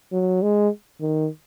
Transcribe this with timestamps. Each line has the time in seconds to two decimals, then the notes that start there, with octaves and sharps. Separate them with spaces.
0.12 F#3
0.42 G#3
1.01 D#3